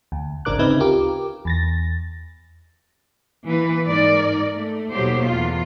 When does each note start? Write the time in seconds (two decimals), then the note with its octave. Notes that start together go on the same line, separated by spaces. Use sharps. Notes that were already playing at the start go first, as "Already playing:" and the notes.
0.12 D2
0.45 G#1 C#3 D4 A#4 D6 F#6
0.59 D2 C#3 C4 D#4 B4 E5
0.80 F4 G4 A#4 D6
1.45 E2 A6 A#6
3.45 E3 A#3 B4
3.87 G#2 D#4 A#4 D5
4.52 A3
4.93 D#2 B2 F#3 A3 G4 C5
5.24 E2 F4